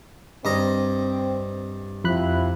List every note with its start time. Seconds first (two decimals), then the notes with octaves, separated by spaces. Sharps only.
0.45 G2 C4 D#5 A#5
2.04 F2 C3 E4 F4 B5 F#6